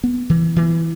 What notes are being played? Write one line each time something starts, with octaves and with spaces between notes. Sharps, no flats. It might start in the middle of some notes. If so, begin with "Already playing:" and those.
B3
E3
E3